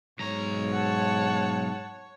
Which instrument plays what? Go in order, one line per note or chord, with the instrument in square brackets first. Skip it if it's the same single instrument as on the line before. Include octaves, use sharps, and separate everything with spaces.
[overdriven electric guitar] B1 A#5 [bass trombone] G#2 [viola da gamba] C#5
[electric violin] F#5 A5